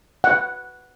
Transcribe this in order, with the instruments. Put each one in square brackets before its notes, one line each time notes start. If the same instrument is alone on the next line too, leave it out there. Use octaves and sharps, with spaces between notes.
[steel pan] F#5